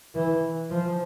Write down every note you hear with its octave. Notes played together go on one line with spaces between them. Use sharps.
E3
F3